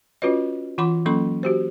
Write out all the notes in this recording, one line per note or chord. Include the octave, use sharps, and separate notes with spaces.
C#4 F4 F#4 B4 C#5 D#5
E3 F4 F#5 B5 C6 D6
F#3 A#3 C#4 A4 C6 C#6
F#4 G4 C5